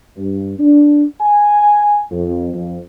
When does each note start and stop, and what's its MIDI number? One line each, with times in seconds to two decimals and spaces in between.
0.16 0.54 43
0.59 1.06 62
1.21 2.02 80
2.11 2.50 41
2.54 2.79 41